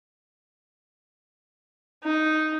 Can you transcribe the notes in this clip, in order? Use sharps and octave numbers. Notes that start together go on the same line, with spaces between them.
D#4